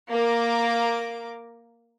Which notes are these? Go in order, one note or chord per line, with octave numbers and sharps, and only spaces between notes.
A#3 A#4 D6